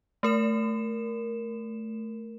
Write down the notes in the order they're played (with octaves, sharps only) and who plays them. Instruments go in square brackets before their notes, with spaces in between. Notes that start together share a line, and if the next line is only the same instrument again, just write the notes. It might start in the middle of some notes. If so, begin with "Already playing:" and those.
[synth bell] A3 A#4 E7